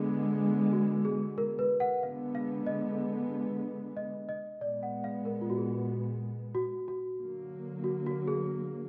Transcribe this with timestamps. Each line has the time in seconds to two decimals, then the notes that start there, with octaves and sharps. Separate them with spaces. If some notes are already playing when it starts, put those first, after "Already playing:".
Already playing: D3 G#3 B3
0.72 F#4
1.05 G#4
1.38 A#4
1.59 B4
1.80 F#5
2.02 D3 G#3 B3 F5
2.35 F5
2.67 D#5
3.97 D#5
4.29 D#5
4.61 A#2 G#3 B3 D5
4.83 F#5
5.04 F5
5.25 A#4
5.41 F4
5.50 F#4
5.58 G#4
6.55 F#4
6.88 F#4
7.20 D3 F#3 A#3
7.84 F#4
8.06 F#4
8.28 G#4